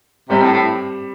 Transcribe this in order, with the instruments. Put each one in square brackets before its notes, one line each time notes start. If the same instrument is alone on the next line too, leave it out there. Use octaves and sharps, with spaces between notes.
[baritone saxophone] C3 [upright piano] G3 C4
[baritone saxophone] A2
A2